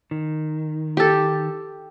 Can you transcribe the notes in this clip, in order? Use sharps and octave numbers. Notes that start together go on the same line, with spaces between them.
D#3
G4 A4